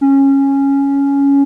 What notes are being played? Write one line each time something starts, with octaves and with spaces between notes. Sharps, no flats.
C#4